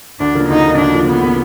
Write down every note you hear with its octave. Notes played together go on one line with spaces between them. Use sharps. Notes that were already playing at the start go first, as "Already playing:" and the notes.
D2 D4
C#3 F3 A#3
D2 D#4
C#3 F3 A#3
D2 D4
C#3 F3 A#3
D2 B3
C#3 F3 A#3